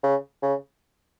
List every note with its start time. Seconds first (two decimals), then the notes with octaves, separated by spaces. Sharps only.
0.04 C#3
0.42 C#3